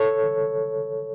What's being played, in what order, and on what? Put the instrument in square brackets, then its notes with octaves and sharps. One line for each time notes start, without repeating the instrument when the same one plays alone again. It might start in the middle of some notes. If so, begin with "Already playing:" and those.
Already playing: [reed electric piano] A4 C#5